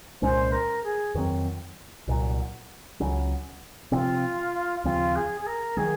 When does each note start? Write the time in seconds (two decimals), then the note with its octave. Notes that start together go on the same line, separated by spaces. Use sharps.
0.22 C2 A#2 G#3 C#4 C5
0.52 A#4
0.84 G#4
1.15 F2 D#3 F#3 C4
2.08 C2 A#2 F#3
3.00 C#2 C#3 F#3 C#4
3.92 C3 F3 C4 F4
4.84 D#2 C#3 F3 C4 F4
5.16 G#4
5.41 G#4
5.47 A#4
5.77 D#3 F#3 G#4